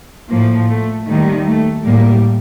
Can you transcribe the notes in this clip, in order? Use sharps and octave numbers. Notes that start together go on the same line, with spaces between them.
A2 F3 A#3
A3
D#2 D#3 G3 A3
A3
A2 G3 A#3